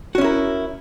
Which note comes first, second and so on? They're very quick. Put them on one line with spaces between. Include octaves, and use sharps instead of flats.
F#4 C#4 E4 A#4